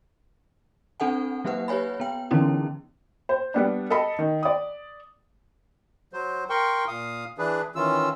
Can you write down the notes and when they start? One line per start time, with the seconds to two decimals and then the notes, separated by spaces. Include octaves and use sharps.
1.00 C4 D4 A4 F#5 G#5
1.45 F#3 A#3 G4 B4 F#5
1.68 G4 B4 C#5 G#5 B5
2.00 B3 G5
2.31 D3 E3 B3 C#4 D#4 E4
3.29 C5
3.54 G3 B3 D4
3.90 A4 D#5 B5
4.19 D#3
4.43 D5 D#6
6.13 F#3 C5
6.50 A#4 G5 C6 C#6
6.88 A#2 F5 D#6
7.38 E3 D4 G#4 B4
7.75 D#3 E3 C#4 F4 E6